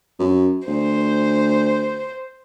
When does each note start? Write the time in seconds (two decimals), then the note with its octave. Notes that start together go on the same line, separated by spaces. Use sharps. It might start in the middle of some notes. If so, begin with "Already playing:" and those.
0.19 F#2
0.68 D2 C5